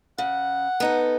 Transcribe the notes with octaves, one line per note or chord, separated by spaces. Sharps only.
C#3 F#5
B3 D#4 A4